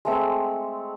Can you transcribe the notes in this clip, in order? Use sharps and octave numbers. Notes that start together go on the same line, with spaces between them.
G#3 A3 C4